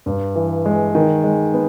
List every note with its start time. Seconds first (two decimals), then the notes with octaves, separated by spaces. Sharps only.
0.06 G2
0.36 E3
0.66 G#3
0.95 D#3
1.24 G#3
1.54 B3